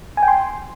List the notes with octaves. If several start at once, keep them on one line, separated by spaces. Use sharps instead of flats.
G#5
G5
C6